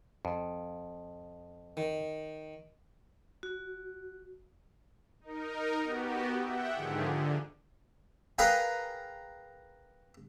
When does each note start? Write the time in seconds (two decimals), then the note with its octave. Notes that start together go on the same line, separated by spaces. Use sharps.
0.25 F2
1.77 D#3
3.43 F#4
5.21 D#4 A#4
5.84 B3 F#4 G4
6.37 E5 F#5 G5
6.74 G#2 D3 D#3 F3 G4 G#4
7.04 D3
8.39 G#4 A#4 B4 F5 G5 G#5